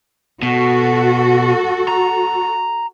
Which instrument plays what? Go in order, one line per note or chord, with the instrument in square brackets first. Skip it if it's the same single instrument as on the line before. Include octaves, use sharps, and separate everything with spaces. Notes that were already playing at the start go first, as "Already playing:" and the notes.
[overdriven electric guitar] B2 [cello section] F#4 A4
[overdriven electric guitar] A#5